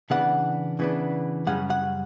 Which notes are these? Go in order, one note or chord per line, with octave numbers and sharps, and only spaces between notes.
C#3 E3 B3 D4 F#5
C#3 E3 B3 D4
F#2 C#3 G3 C#4 F#5
F#5